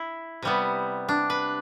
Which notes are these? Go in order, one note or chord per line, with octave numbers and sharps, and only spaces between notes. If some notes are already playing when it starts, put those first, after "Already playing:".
Already playing: E4
C3 G3 B3
D4
B4